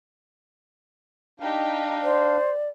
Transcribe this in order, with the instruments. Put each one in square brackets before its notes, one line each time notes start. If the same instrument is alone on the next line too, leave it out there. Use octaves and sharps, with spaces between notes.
[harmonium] D4 F5 [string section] D#4 G4
[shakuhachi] C5 [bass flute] D5